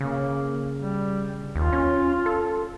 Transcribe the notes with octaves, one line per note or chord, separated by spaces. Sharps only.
C#3 A#3
G3
D#2 F4
C#4
A4